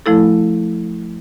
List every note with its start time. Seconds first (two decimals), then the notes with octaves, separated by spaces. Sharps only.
0.06 F3 A3 E4 A4